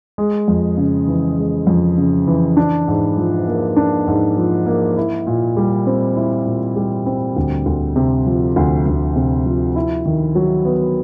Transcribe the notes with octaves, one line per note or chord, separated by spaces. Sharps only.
G#3
F2
C#3
E3
G#3
F2
C#3
E3
D4
G#2
F3
A#3
D4
G#2
F3
A#3
E4
A#2
G3
C4
E4
A#2
G3
C4
D2
D2
C3
F3
D2
D2
C3
F3
E4
D#3
F#3
B3